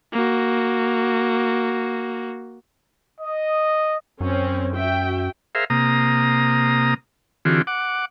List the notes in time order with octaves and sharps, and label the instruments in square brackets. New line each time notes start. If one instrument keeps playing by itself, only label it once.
[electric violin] A#3 F#4
[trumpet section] D#5
[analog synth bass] F#2 [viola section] C4 C#4
[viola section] F#4 E5 G5
[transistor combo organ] G#4 A#4 C5 E5 F5
C3 A#3 A#5 D#6
D3 E3 C4 F4 F#4 G#4
F#5 D6